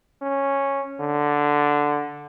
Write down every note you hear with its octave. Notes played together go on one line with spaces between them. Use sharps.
C#4
D3